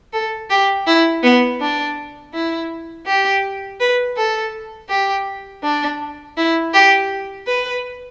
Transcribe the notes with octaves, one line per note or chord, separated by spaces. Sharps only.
A4
G4
E4
B3
D4
E4
G4
B4
A4
G4
D4
E4
G4
B4